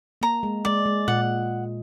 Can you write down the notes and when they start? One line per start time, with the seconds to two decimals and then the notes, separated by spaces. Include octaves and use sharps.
0.21 A#3 A#5
0.43 G#3
0.65 G#3 D5
0.86 G#3
1.08 A#2 F#5